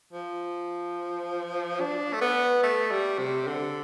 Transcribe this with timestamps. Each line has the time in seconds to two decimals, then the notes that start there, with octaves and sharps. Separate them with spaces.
0.13 F3
1.80 D4
2.13 A3
2.21 B3
2.63 A3
2.91 G3
3.18 C3
3.47 D3